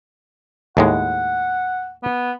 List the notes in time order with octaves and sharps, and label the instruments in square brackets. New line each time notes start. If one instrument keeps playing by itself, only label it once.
[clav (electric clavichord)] D#2 A2 G#3 [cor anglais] F#5
[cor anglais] B3